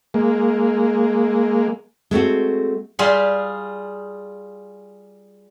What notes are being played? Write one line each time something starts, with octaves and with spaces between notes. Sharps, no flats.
G#3 A#3
G#3 A3 C4 F#4
G3 F4 G#4